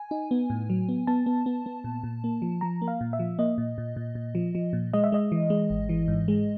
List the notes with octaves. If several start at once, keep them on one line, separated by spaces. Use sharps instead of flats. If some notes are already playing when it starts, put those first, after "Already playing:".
Already playing: G#5
D#4
B3
A2
F#3
B3
B3 A5
B3
B3
B3
A#2
A#2
A#3
F3
F3 A#5
A#3
F5
A#2
E5
F3
A#3 D#5
A#2
A#2
A#2
A#2
F3
F3
A#2
G#3 D#5
E5
G#3 D#5
E3
G#3
G#1
E3
G#2
G#3